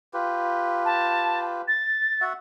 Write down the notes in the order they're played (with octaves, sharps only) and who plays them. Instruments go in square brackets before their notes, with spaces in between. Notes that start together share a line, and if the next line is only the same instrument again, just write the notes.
[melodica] F4 G4 B4
[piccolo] A5
A6
[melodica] F#4 E5 F#5